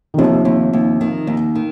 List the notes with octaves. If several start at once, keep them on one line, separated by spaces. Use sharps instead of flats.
D#3
D#2 C3 F3
D#2
D#2
D#3
D#2
D#3